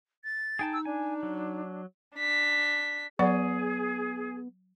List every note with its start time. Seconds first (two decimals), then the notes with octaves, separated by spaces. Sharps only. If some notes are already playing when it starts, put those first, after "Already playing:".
0.24 A6
0.59 D#4 G#4 G5 A5
0.73 E6
0.85 D4 G#5
1.23 F#3
2.16 D4 B6
3.19 F#3 B3 G#4 D5 F#5